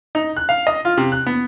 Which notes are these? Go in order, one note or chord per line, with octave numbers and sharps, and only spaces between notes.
D#4
F#6
F5
D#5
F4
C3
F#6
B3